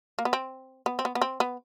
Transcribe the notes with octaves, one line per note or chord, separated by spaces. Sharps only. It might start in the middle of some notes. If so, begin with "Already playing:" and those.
A#3
B3
C4
B3
C4
B3
B3
C4
B3